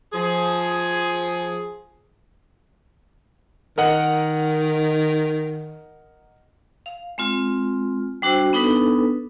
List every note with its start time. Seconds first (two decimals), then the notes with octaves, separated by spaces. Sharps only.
0.13 F3 G#4
3.78 D#3 A#4 D#5 F#5
6.86 F5
7.18 G#3 C4 F4
8.22 G3 D4 F#4 C5 E6
8.53 B3 D4 D#4 A4 B4